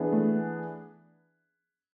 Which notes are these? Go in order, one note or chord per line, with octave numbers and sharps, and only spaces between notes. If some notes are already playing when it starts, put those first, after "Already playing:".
Already playing: E3 B3 D4 G#4 B4
A3